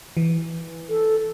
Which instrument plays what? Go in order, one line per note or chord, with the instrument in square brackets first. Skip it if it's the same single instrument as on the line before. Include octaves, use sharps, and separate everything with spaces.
[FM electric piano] E3
[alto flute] A4